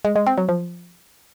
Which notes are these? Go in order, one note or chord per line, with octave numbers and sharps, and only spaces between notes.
G#3
G#3
C4
F#3
F3